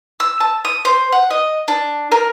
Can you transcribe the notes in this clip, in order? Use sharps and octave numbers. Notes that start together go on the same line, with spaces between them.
E6
A5
D#6
C5
F#5
D#5
D4
A#4